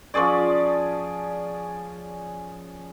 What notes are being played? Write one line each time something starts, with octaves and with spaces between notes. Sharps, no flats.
F3 C#4 G#4 D5